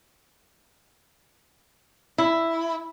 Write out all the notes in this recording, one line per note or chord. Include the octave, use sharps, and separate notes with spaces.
E4